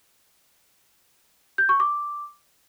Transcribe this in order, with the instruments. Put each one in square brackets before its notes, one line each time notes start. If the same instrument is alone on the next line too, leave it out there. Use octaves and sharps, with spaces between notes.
[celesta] G6
C#6
D6